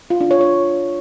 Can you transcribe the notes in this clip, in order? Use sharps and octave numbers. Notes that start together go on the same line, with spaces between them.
F4
D4
C#5
C#5